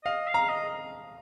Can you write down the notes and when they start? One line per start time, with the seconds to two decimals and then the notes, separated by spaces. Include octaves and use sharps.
0.04 D#5 F5
0.27 F5
0.34 A#5
0.49 D#5